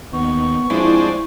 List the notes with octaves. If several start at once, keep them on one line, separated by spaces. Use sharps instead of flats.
D#2 B3 C#6
F3 G#3 C4 D4 E4